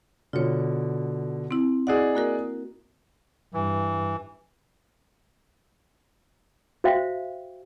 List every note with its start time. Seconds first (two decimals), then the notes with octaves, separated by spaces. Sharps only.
0.33 B2 D3 F4 C#5
1.51 C4 E4
1.87 E4 F#4 G#4 D5 D#5 F#5
2.15 A#3 F#4 A#4
3.54 G2 E3
6.84 F#4 C5 E5 F5 G5